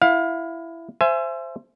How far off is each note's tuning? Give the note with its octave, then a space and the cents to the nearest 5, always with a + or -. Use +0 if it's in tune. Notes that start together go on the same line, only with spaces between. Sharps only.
E4 +10 F5 +25
C5 +0 E5 +30 G#5 +15